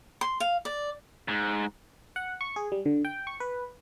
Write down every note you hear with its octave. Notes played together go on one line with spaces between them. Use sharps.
C6
F5
D5
G#2
F#5
C#6
G#4
G3
D3
G5
C#6
B4